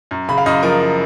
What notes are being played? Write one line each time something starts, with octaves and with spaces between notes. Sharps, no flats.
F#2
C#3 B5
F5
F#2 D#5
F3 A#4